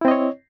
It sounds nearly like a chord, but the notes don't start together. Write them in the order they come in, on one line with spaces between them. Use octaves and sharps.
E4 C4 D#5 C#5